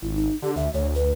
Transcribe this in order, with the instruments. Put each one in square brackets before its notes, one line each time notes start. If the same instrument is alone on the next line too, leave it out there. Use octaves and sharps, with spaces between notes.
[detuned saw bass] G#1 [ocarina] E4
[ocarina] D#4
[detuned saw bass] D3 [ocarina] G4
[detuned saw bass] D2 [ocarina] E5
[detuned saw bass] D2 [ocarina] C#5
[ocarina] B4